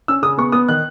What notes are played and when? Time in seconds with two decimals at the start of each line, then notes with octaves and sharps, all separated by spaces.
0.08 C#4 E6
0.22 C#3 D#6
0.38 B3 C#6
0.52 B3 D#6
0.68 D#3 F#6